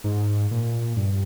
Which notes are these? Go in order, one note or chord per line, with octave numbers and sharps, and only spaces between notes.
G#2
A#2
G2